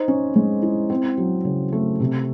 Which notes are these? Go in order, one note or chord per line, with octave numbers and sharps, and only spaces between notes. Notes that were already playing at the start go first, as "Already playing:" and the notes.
Already playing: D#4 C5
C#4
G#3
E4
C4
F#3
C#3
A3
C3